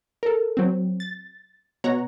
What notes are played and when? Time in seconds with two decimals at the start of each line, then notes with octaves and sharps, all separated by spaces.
0.23 A4 A#4
0.57 F#3 C4
1.00 A6
1.84 B2 C#5 F#5 A#5